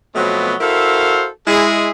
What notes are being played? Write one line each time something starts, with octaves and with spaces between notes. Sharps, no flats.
B2 F3 F#3 A3 B3 C4
E4 F#4 A4 A#4 C5 F5
G#3 E4 G#4